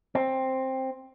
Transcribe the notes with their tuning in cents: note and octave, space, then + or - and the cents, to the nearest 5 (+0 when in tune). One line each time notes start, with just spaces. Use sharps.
C4 +10